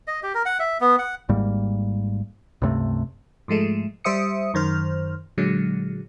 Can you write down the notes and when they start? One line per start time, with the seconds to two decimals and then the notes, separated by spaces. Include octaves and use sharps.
0.07 D#5
0.23 G4
0.35 A#4
0.46 F#5
0.59 E5
0.81 B3
0.99 F#5
1.29 G#1 G#2 G3 A#3
2.62 C#2 G2 C3 A3
3.48 G#2 F3 G#3 A3
4.04 G3 C5 E5 D#6 C#7
4.54 F#2 D#3 C5 F6
5.38 A#2 D3 F#3 G#3